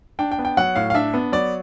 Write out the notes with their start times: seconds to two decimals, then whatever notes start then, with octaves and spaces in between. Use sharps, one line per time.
0.19 D4 G5
0.31 G5
0.39 B3
0.45 G5
0.57 F#3 F#5
0.76 A2 F5
0.90 F5
0.94 D4 E5
1.14 B3
1.32 F#3 D5